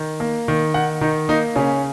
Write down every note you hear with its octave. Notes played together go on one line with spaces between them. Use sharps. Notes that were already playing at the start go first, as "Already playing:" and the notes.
Already playing: D#3
A#3
D#3
D#3 F#5
D#3 D#4
A#3 D#4
C#3 C#4